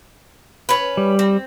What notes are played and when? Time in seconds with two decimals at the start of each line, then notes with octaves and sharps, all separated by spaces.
0.69 C#4 B4
0.97 G3
1.19 C4